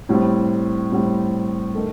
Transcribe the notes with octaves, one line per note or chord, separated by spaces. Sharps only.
A2 G3 C4
A2 G3 C4
D#3 A3